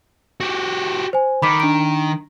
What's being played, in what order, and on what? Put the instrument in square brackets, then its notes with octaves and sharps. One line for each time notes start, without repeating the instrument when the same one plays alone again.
[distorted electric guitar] F#4 G4
[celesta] C5 G#5
[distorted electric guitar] D#3 [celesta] B5 D6 B6
[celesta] D4 D7